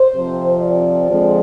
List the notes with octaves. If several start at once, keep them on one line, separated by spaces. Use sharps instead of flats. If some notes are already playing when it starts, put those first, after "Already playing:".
Already playing: C5
F2 C3 F3
D5
F2 D3 F3 G#3